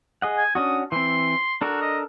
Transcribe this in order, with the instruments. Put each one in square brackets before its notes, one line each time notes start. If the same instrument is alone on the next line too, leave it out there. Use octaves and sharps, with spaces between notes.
[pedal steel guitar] G#4 D#5 F#5
[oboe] G#5
[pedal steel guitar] C#4 D4 F#4 [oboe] D#6
[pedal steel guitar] E3 C4 [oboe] C6
[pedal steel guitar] D4 A4 A#4 [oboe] F#4
[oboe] D#5